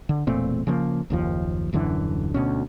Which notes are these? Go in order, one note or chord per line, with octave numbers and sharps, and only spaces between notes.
D3
E1 A#2 A3 C4
C#3 F3 A#3
F#1 D#2 F3
D#1 F#2 D3 E3
D2 B2 C#4